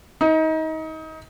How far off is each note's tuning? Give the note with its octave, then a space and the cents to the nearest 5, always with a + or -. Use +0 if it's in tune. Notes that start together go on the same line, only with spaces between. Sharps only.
D#4 +30